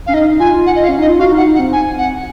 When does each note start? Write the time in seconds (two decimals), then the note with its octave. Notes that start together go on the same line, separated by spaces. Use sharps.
0.07 C#4 F5
0.14 D#4 D#5
0.31 D#4
0.40 F4 G#5
0.53 F4
0.66 F#5
0.76 D#5
0.84 F5
0.89 C#4
0.99 D#4 D#5
1.09 F4
1.19 F#4 F5
1.32 D#4
1.37 F#5
1.46 D#4
1.55 F#5
1.59 C4
1.73 G#5
1.98 F#5